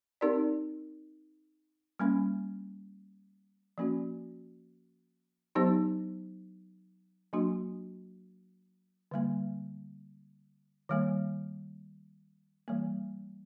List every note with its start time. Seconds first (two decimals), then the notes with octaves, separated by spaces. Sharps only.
0.21 C4 D#4 G4 A#4 D5
2.00 G3 A#3 C#4
3.78 F3 A#3 C#4 F#4
5.55 F#3 B3 D#4 G4 C5
7.33 F#3 A#3 D4 F#4
9.11 D3 G3 A#3
10.89 D#3 G3 A#3
12.68 E3 G3 A#3